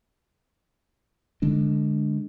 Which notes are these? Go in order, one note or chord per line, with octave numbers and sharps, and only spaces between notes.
D3 G#3 D4